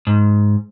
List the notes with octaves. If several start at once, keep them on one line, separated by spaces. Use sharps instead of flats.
G#2